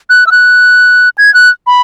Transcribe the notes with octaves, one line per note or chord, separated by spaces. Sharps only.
F#6
E6
F#6
G#6
F#6
B5